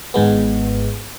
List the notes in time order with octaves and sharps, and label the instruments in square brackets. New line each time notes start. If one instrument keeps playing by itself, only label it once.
[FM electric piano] G#1 G#2 G#3 B3